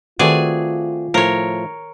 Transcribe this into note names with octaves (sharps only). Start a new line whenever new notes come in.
D#3 A3 C4 F4 F#4 G#4 D5 G#5
A2 F3 A#4 C#5